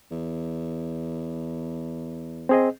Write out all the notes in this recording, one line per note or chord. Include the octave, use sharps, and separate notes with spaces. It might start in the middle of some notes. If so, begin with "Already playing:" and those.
E2
C4 G#4 D#5